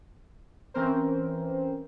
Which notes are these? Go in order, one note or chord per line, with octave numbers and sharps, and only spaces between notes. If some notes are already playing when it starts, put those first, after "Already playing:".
E3 C4 C#4 A#4 C5